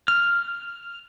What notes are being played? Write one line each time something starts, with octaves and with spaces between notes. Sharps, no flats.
F6